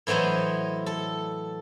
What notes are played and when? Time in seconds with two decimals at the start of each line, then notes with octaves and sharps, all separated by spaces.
0.07 A2 E3 F#3 C5 D#5
0.86 A4